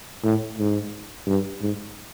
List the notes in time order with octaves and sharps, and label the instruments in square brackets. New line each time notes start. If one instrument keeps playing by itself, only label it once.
[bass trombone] A2
G#2
G2
G#2